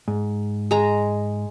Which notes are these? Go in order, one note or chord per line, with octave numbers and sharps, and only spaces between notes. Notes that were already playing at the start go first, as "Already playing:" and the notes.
G#2
G#3 A#5